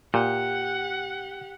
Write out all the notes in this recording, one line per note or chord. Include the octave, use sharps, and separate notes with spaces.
A#2 G4 F#5